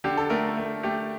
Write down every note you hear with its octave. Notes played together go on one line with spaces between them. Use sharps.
D3 G4
A4
A3 A#4
A3
A3 G4